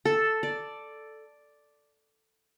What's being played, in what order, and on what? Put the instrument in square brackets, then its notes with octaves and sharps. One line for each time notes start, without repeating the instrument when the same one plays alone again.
[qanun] A4
D5